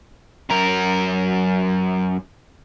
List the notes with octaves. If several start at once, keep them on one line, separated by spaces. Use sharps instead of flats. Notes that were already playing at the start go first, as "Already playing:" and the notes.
F#2 A#4